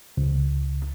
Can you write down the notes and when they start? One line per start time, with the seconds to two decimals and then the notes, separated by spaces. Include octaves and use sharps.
0.17 C#2